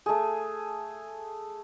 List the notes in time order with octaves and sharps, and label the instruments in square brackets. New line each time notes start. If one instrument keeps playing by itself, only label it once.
[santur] A3 G#4